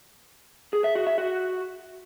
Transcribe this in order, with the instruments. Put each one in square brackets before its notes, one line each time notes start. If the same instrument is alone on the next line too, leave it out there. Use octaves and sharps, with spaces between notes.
[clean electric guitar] G#4
E5
F#4
E5
F#4